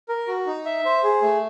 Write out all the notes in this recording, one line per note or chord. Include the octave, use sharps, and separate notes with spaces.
A#4
F#4
D#4
E5
C5
G#4
A3